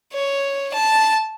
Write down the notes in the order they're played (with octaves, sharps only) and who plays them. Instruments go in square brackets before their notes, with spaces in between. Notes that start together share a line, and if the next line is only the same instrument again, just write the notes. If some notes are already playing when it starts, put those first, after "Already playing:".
[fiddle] C#5
A5